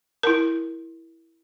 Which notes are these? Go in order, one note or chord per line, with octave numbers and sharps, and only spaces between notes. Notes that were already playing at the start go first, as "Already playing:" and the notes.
E4 A#4